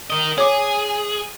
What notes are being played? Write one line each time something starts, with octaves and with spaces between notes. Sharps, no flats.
A#4 D#5
G#4 C#5 D6